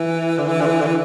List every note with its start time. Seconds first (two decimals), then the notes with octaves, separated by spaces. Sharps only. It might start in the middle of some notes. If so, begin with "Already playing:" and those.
Already playing: E3
0.38 D3
0.47 E3
0.61 D3
0.66 E3
0.81 D3
0.86 E3